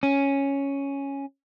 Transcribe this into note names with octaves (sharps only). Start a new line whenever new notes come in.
C#4